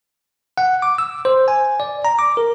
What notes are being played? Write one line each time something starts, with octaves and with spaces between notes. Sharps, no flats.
F#5
D6
E6
C5
G#5
D5
A#5
D6
A#4